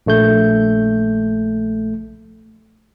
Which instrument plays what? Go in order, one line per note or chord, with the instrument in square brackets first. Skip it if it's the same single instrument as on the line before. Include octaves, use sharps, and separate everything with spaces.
[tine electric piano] A#1 A3 G6